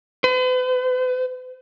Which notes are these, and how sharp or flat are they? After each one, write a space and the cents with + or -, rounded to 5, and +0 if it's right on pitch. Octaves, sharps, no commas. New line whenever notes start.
B4 +45